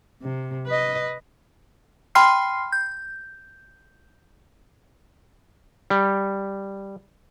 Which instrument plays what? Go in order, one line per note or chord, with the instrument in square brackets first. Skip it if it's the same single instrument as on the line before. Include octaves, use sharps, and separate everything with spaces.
[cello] C3
B4 D#5
[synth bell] G5 B5 C6 F6 C7
G6
[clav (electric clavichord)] G3